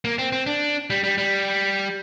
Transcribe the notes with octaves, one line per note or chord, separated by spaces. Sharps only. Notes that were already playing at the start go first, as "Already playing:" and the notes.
A#3
C4
C4
D4
G3
G3
G3